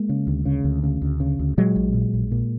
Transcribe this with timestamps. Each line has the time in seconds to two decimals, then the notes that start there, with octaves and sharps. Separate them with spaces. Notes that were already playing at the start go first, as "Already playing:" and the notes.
Already playing: G#3 A#3
0.09 C#3
0.27 D2
0.45 C#3
0.64 D2
0.83 C#3
1.02 D2
1.20 C#3
1.39 D2
1.57 A#2 F#3 G#3
1.76 A#1
1.94 A#2
2.14 A#1
2.32 A#2